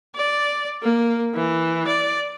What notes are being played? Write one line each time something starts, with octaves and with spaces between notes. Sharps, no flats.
D5
A#3
E3
D5